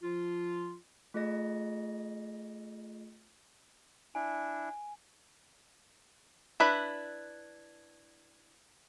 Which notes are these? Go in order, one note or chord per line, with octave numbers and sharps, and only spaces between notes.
F3 F4
A3 F4 G#4 D#5 A#6
D4 E4 G#5
D4 E4 B4 B5